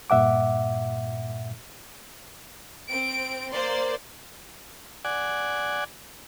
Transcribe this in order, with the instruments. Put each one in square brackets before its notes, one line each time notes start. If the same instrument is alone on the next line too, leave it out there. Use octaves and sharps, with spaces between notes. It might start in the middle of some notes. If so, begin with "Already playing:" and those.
[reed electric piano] G2 A#2 E5 F#5 D6
[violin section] C4 D7
A#3 C5 D5 C6
[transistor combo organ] D5 F#5 G#5